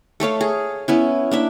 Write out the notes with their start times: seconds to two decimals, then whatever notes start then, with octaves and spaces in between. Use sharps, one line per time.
0.20 A3 A4 C#5 F5
0.41 G#4
0.88 B3 C#4 E4
1.31 A#3 D4 E5